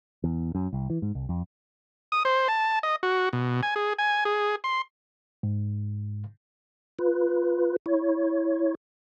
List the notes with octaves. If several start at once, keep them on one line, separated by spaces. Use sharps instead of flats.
E2
F#2
C2
E3
G#2
C2
F2
D#6
C5
A5
D#5
F#4
B2
G#5
G#4
G#5
G#4
C6
G#2
F4 B4
E4 C#5